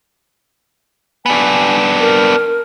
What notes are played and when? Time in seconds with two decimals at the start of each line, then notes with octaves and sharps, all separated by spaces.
1.26 B3 D4 G#5
2.00 A#4